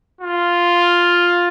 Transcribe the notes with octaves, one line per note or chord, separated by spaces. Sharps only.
F4